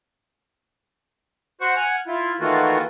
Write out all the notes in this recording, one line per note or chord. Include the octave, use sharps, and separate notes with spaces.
F#4 C5 F#5 C#6
F#5 G#5 F6
E4 F4
D#3 E3 A3 A#3 F4 F#4